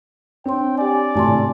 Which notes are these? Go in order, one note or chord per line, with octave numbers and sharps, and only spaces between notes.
C4 D4 C#5 G5 C6
G4 D5 G#5
G#1 A2 C3 G#5 A5 C6